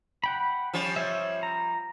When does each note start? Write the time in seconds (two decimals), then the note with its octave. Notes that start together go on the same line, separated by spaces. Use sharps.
0.24 F#5 G5 B5
0.73 F3 G3 C#4
0.96 C#5 E5
1.43 A#5